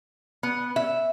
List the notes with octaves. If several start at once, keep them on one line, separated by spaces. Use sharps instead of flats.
B3
E5